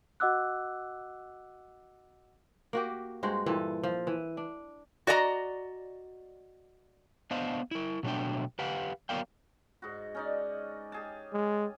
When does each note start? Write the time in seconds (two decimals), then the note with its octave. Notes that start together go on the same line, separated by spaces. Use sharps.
0.20 F#4 D#5 F#5 D6 E6 F#6
2.73 A#3 F#4 G4
3.23 G2 G#3 F#4 C5
3.46 G2 A#2 E3 A4
3.83 F3
4.07 E3
4.37 D4
5.07 F#4 D5 D#5 A#5
7.31 B3 D4 C5 D#5 F5
7.71 E4 A#4
8.03 B2 F#3 A3 B3 D4 G5
8.59 G4 B4 F5 F#5
9.09 F#3 B3 A#4 D5 F5 G5
9.82 G#2 F#4
10.15 C#4 D#4 D5
10.92 G4 G#4 A5
11.33 G#3